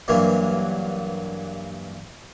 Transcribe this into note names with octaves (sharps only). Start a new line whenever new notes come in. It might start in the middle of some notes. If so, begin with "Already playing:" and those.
G2 E3 F#3 A#3